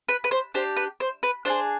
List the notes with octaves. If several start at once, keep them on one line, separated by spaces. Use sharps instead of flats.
B4
B4
C5
D4 G4 C5
B4
C5
B4
D4 F4 G#4 C5